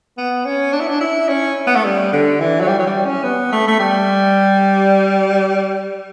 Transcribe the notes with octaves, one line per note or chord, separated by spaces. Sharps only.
B3
C#4
D4
E4
D4
E4
C#4
B3
A3
G3
D3
E3
F#3
G3
F#3
G3
C#4
B3
A3
A3
G3